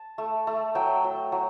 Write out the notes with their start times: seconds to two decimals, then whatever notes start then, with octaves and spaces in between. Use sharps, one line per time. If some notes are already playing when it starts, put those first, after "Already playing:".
Already playing: A5
0.18 A3
0.47 A3
0.75 F#3 G5
1.04 F#3
1.32 F#3